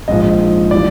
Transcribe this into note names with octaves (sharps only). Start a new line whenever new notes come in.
A#1 G#2 F3 D#5
E3 G3 D5